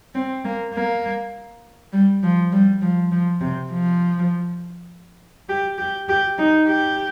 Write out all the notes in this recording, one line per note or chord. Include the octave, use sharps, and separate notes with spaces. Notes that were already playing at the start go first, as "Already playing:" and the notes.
C4
A#3
A#3
G3
F3
G3
F3
F3
C3
F3
G4
G4
G4
D#4
G4